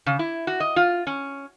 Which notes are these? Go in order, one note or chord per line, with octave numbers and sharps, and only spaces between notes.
C#3
E4
F#4
D#5
F4
C#4